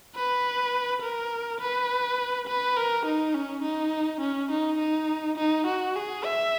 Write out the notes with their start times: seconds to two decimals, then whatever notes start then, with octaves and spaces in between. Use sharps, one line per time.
0.15 B4
1.02 A#4
1.61 B4
2.48 B4
2.77 A#4
3.06 D#4
3.34 C#4
3.63 D#4
4.21 C#4
4.51 D#4
4.79 D#4
5.38 D#4
5.67 F#4
5.96 G#4
6.25 E5